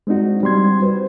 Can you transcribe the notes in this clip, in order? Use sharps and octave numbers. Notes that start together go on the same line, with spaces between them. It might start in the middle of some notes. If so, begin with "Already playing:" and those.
G#3 C4 D4 D#4 F#4
G3 C4 C6 G#6
F#4 B4 C5